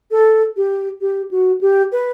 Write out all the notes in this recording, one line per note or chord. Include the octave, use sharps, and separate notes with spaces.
A4
G4
G4
F#4
G4
B4